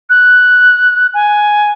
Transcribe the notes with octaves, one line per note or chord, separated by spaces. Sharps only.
F#6
G#5